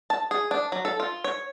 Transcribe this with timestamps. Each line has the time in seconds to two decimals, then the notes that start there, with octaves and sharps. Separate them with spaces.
0.10 A5
0.31 G#4
0.51 D4
0.72 F#3
0.85 A4
1.00 F4
1.24 C#5